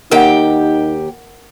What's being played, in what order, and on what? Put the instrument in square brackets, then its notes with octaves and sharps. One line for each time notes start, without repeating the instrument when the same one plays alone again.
[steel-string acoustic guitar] D#2 G4 G5 [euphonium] D#4 [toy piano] A#4 E5 F#5